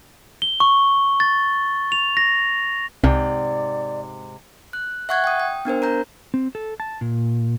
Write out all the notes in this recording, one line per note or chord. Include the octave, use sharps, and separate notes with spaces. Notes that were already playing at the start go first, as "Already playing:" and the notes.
G7
C#6
A6
F7
A#6
C2 G#2 C3 D5
F#6
E5 F#5 C#6 F#6 G#6
G5 D#6
G5
B3 D4 A#4 C5
A#4 A#5 G6
C4
A4
A5
A#2